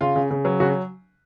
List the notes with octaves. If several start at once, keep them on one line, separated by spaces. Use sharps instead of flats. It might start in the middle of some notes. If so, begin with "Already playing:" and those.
C#3 F4
C#3
C#3
F#3
C#3 F#4